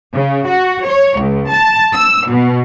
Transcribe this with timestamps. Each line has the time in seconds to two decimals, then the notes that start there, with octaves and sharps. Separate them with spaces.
0.14 C#3
0.47 F#4
0.86 C#5
1.20 C#2
1.51 A5
1.92 E6
2.30 B2